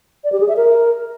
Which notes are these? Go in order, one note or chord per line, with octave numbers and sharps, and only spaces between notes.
D5
G4
G#4
E5
A#4